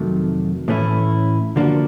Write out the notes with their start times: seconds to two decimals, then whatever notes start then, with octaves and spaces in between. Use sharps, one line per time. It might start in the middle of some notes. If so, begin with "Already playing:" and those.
Already playing: F2 C3 D#3 F#3 A3
0.68 A2 E3 A3 C#4 E4
1.56 D3 F3 A#3 D4 F#4